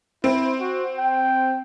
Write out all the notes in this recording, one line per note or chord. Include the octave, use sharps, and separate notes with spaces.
C4 E4
F#4
G5